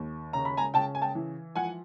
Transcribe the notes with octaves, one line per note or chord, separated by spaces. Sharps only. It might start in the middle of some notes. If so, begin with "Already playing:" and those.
Already playing: D#2
C#3 A#5
B5
G#5 A#5
C#3 G5 A5
G#5
G5 A5
E3
F3 F#5 G#5